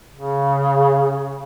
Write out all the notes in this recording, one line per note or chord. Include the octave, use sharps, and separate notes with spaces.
C#3